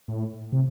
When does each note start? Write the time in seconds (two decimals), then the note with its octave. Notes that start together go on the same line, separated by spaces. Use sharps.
0.08 A2
0.52 C3